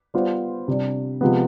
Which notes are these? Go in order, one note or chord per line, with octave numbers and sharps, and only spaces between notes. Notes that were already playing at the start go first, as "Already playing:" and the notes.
G3 B3 F4 C5
C3 G3 D4
C3 F3 G#3 B3